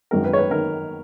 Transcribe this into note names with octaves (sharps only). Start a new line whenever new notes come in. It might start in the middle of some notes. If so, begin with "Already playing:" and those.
G#1 F#2 D#3 A#4
B4
C#5
B4
D#3 A#4